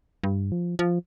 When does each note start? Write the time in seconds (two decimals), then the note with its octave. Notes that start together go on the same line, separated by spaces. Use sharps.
0.23 G2
0.52 F3
0.79 F3